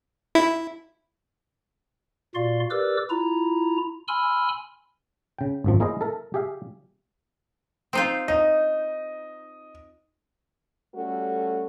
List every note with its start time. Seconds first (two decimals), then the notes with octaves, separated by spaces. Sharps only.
0.35 E4
2.35 A#2 F4 F#4 D5 F5 C6
2.71 G4 A#4 B4 D5 D6 E6
3.10 E4 F4 A#5
4.08 G#5 B5 C6 E6 F6
5.38 C#3 G5
5.64 G#1 F#2 F3
5.80 A#3 E4 G#4 A#4 C5 D#5
6.01 A4 A#4 E5
6.34 G4 G#4 E5 F5
7.93 C4 D#4 F4
8.28 D#4 D#5
10.95 G3 A3 C#4 F#4 G4 A4